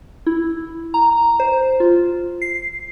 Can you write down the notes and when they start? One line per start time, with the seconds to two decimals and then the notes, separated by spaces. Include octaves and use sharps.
0.27 E4
0.94 A#5
1.40 C5
1.80 F4
2.42 C7